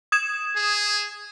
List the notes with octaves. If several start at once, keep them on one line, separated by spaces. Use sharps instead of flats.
D#6 G#6 E7
G#4